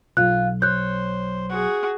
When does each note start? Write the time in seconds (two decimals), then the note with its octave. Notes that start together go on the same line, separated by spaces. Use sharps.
0.17 B1 F4 F#6
0.62 C5 C#5 F#6 G6
1.50 F#4 G#4